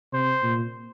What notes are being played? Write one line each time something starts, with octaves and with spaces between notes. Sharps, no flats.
C3 C5
A#2